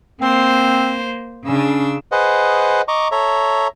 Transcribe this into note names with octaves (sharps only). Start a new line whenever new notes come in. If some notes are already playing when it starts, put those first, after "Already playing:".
A#3 C4 C5
C#3 C#4 D4 E6
G#4 B4 C5 D#5 F#5
D#5 A#5 C#6 D6
A4 C#5 E5 A#5